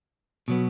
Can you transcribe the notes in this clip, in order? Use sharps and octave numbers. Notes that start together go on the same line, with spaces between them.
B2 F#3 B3